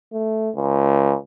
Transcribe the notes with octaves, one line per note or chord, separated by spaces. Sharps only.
A3
C#2